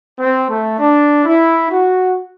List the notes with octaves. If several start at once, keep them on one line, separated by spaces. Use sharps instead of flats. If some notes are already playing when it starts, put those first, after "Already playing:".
C4
A3
D4
E4
F#4